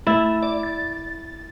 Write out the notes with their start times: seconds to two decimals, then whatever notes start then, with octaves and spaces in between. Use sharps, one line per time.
0.07 A3 E4 E7
0.43 D5
0.63 A6